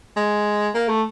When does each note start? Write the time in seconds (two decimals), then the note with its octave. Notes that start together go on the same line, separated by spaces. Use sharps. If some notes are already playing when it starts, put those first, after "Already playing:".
0.16 G#3
0.75 A#3
0.89 A3